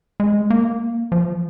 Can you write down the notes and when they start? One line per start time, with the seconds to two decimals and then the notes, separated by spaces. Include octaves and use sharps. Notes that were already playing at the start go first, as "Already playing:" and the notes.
0.20 G#3
0.50 A#3
1.12 F3